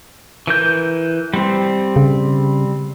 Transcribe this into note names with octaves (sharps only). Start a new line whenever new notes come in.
E3 A#4 G6
G3 C4
C#3